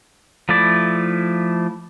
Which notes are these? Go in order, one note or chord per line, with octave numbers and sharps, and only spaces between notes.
F3 A3 E4 D5